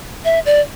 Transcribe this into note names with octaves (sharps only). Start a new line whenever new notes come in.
E5
D5